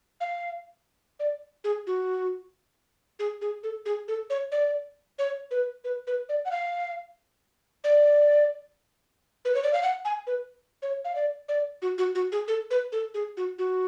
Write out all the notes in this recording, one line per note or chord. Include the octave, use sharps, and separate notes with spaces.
F5
D5
G#4
F#4
G#4
G#4
A4
G#4
A4
C#5
D5
C#5
B4
B4
B4
D5
F#5
F5
D5
B4
C#5
D5
F5
F#5
G#5
B4
C#5
F5
D5
D5
F#4
F#4
F#4
G#4
A4
B4
A4
G#4
F#4
F#4